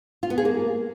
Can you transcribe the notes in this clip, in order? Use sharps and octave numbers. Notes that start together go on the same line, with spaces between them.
F4
B3
G#4
A#3